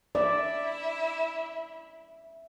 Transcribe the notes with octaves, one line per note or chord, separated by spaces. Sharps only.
E4 D5 E5